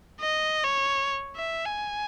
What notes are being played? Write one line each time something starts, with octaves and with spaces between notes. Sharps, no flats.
D#5
C#5
E5
G#5